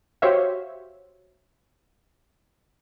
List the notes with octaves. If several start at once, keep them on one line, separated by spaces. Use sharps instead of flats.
F#4 G4 C5 C#5 E5 F5